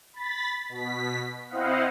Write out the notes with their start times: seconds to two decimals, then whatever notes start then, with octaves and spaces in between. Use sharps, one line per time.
0.14 B5 A6 B6
0.69 B2 B6
1.49 C4 E4 C5 D#5 F5 F#5